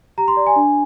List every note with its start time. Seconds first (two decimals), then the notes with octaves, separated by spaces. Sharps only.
0.18 G4 A#5
0.28 C6
0.37 D5
0.47 G#5
0.56 D4